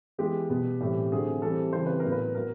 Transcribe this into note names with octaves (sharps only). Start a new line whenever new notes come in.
E3 G#3 B3 G4
B2 G3 B3
A2 E3 G3 C4
D3 F#3 A3 C4 G#4
E3 G3 C4 A4
C#3 E3 G3 C4 C5
B4
A2 F#3 B3 A#4
B4
F#3 B3 A#4